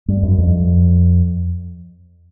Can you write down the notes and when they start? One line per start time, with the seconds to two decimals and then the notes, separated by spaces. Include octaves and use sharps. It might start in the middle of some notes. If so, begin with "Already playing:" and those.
0.08 G2
0.23 F#2
0.38 F2